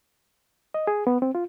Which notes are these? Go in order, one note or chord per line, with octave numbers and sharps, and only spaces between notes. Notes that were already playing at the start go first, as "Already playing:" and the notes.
D#5
G#4
B3
C4
F4